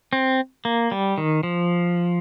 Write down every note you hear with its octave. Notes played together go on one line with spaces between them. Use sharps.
C4
A#3
G3
D#3
F3